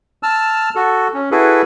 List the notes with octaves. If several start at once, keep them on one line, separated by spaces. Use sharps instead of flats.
A5 E6 F6
F#4 A4
C#4
E4 F#4 G#4 A4 B4